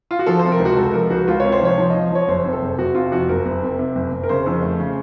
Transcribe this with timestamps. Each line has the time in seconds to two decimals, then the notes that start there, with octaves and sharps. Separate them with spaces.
0.11 F4
0.19 F#4
0.26 F3 A4
0.39 C3 C5
0.52 A#4
0.60 C#2
0.65 F#4
0.77 C#2 A4
0.93 F3 A#4
1.10 C#2 F#4
1.28 C#2 F4
1.40 C3 C#5
1.52 C5
1.61 F3 C#5
1.78 F3
1.90 F3 D#5
2.11 F3 C#5
2.28 F#1 C5
2.45 C3
2.53 A4
2.61 F#1
2.78 F#1 F#4
2.95 C3 F4
3.12 F2 F#4
3.29 F#1 A#4
3.46 F#1
3.62 C3
3.79 C3
3.95 F#1
4.12 F#1
4.23 A#4
4.29 C#3 C5
4.46 F2
4.62 A3
4.80 C#3